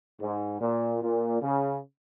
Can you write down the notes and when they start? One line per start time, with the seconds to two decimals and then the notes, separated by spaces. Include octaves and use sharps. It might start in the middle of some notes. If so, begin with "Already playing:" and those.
0.21 G#2
0.61 A#2
1.03 A#2
1.42 C#3